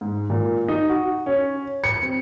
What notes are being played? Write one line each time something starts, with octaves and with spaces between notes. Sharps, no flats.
G#2
A#2
D#4
F#4
C#4
C#7
C4